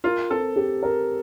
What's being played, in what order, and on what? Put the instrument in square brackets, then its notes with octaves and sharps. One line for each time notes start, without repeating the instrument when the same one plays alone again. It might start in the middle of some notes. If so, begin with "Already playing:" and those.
[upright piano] F4 [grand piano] A#4
[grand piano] C4 [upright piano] A4
[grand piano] G4
A#4